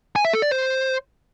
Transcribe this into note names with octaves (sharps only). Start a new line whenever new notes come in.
G#5
E5
A4
D5
C5